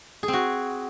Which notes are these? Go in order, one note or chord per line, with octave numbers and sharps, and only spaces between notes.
G#4
C4
F#4